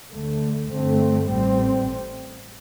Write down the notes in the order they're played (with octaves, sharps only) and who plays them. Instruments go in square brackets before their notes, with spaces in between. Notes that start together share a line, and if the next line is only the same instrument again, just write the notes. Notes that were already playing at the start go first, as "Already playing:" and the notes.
[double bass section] D2 D3 A3
G2 D3 A3 C4
A1 A2 G3 C4